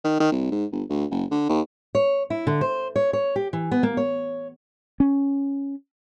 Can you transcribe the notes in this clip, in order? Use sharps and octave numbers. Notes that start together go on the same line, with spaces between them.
D#3
D#3
C2
G#2
G1
D2
F#1
D3
D#2
C#5
E4
D3
C5
C#5
C#5
G4
E3
B3
A#3
C#5
C#4